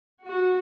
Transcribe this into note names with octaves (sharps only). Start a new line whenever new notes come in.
F#4